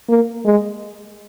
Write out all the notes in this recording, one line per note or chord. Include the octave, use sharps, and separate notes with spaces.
A#3
G#3